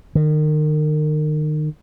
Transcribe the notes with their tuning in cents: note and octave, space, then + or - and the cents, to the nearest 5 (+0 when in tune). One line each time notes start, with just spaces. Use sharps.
D#3 -30